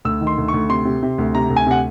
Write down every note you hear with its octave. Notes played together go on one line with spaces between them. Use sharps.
D2 E6
D#3
C6
D2
C#6
D2
C3 C6
C3
C3
D2
C3 A#5
D2
G#5
C3 F#5